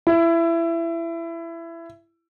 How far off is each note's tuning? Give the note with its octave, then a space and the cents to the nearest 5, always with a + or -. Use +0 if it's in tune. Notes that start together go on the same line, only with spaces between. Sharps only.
E4 +20